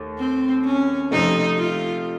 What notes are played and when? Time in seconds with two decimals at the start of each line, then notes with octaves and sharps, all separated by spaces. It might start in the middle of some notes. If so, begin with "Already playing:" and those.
Already playing: D#2 A3
0.19 C4
0.65 C#4
1.11 F2 C3 F3 A3 D#4
1.58 F4